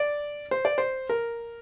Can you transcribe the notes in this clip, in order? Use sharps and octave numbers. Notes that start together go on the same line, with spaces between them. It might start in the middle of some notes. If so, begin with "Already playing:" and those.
Already playing: D5
C5
D5
C5
A#4